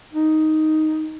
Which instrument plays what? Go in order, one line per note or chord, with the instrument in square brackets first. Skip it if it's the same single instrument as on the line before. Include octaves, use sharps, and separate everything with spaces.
[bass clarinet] D#4